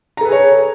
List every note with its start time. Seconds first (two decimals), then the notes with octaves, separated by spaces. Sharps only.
0.17 A#5
0.21 A4
0.25 B4
0.28 G#4
0.32 C#5